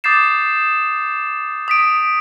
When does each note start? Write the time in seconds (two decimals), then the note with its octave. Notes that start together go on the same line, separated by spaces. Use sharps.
0.04 D6 D#6 G6 A6 C7 E7
1.68 D#6 B6 D7